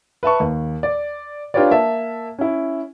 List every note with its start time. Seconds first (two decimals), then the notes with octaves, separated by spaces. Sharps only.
0.23 B4 E5 A5 C#6
0.40 D#2
0.83 D5
1.54 D4 F4 G4 B4 C#5 D5
1.71 A#3 E5 A5
2.39 C#4 E4